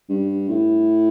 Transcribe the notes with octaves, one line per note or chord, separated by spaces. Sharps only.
G2
A2